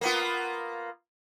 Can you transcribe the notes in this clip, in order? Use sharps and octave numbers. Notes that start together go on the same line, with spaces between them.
A#3 B3 F4